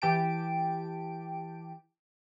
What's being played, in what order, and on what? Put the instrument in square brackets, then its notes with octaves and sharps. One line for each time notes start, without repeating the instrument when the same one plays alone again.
[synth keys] E3 G4 G5 A5 D7